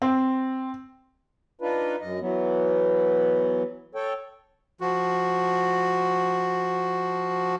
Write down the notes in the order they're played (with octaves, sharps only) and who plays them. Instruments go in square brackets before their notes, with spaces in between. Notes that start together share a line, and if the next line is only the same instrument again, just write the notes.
[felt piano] C4
[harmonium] D4 D#4 F4 B4
F#2 D#5
E3 F#3 B3
A4 C#5 G5
[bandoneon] F3 F#4